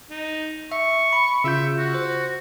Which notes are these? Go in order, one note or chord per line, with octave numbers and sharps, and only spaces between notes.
D#4
E5 C#6
B5
C#3 F4 E5 G6
F#4
C5